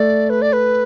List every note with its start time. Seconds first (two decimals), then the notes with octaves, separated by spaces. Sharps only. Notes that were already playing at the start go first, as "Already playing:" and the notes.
Already playing: A3 D5
0.30 B4
0.42 D5
0.53 B4